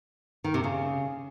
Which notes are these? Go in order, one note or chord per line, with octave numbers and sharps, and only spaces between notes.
D#3
C3
C#3